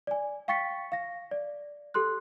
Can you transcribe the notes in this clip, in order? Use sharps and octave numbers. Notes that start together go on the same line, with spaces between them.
D5 G#5
F5 G5 C#6 A6 B6 C#7
F5 A#6
D5
G4 A4 C6 F#6